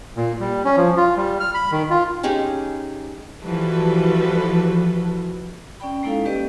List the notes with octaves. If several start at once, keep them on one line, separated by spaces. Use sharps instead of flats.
A#2
G3
C#4
F3
F4
G3
F6
B5
D#3
F4
C#4 D#4 G4 G#4
E3 F3 G3 F#4 A4 B4
C#4 D5 G5 B5
G#3 A#3 D#4 E4 A4 F5
G3 C#4 G4 B4 D5 D#5